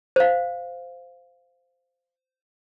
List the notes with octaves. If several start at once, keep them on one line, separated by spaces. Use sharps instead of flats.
C5 F5